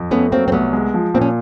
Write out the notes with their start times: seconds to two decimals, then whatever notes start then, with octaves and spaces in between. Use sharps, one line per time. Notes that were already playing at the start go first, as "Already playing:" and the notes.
Already playing: F2
0.11 A3 B3 C#4
0.32 F#3 A#3 C4
0.48 C4
0.52 C2 A3 B3
0.73 G#3
0.94 F3
1.14 A#2 C4
1.21 C#4